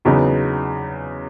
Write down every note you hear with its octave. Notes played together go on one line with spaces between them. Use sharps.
E2 C#3 F#3 B3 D#4